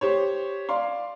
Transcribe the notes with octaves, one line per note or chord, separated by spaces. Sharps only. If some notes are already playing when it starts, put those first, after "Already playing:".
G4 C5 C#5
D5 F5 C6